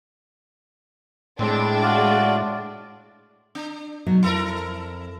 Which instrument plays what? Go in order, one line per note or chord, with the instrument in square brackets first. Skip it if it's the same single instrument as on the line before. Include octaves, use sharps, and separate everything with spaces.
[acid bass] A2 [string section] G#3 D4 [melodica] C4
[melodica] F4 F#4 D5
[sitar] D4
[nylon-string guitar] B2 F#3 D#4
[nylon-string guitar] F2 [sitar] E4 A4 A#4